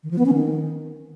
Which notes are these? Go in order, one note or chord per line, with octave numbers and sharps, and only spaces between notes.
D#3
F3
B3
C#4
D#3